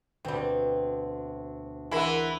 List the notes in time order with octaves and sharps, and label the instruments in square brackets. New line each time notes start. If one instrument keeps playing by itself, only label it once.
[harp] D2 B2 [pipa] G3 C4
[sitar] E3 E4 [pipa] G#4 A#4 [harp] C5 F#5